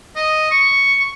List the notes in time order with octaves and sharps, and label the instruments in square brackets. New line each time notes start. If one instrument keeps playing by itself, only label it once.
[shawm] D#5
C#6